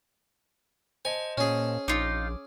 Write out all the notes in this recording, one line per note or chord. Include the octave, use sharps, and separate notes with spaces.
C5 D#5 G#5 A5
A#2 C#4 G#4
A#1 D#4 F4 D6